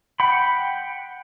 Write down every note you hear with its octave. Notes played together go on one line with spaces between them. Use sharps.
F#5 G5 B5